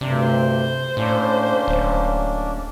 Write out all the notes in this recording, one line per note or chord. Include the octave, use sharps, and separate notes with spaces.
D2 G2 C3 D4
C5
A2 A#3 C#4 D4
D1